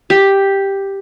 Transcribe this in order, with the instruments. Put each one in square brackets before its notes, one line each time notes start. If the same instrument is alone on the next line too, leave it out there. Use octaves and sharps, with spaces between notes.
[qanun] G4